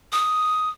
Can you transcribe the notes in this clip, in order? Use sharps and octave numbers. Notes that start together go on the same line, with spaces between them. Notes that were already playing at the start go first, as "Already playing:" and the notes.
D#6